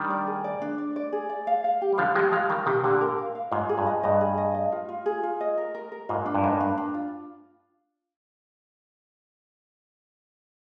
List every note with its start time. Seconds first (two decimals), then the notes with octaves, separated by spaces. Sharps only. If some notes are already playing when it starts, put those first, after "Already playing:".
Already playing: D#3 G3 D4
0.10 D5
0.27 G#4
0.44 D5
0.62 D4
0.78 D5
0.96 D5
1.12 G#4
1.29 D5
1.47 F5
1.64 F5
1.82 G4
1.92 G3
1.98 D3 F3 F5
2.15 F3 G#3 G4
2.32 F3 G#3 F5
2.49 D#3 G3 A#4
2.66 C3 D#3 G4
2.84 A#2 D3 G4
3.01 A#4
3.18 F5
3.35 F5
3.52 G#2 F4
3.69 G#4
3.78 G2
3.87 D#5
4.03 G2 D#5
4.21 G#4
4.38 D#5
4.55 D#5
4.72 F4
4.89 F4
5.06 G#4
5.23 F4
5.41 D#5
5.58 A#4
5.75 A#4
5.92 A#4
6.09 G#2 F4
6.26 D4
6.34 G2
6.43 G#2 A#4
6.53 G2
6.60 D4
6.77 D4
6.94 F4